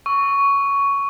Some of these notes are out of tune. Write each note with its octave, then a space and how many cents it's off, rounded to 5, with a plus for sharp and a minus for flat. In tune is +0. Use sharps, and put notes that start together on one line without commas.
C#6 +10 E6 +0